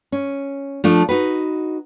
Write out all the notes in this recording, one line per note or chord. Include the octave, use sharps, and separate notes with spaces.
C#4
F3 A3 D4
D#4 F#4 B4